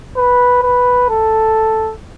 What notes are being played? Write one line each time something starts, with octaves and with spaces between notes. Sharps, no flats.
B4
B4
A4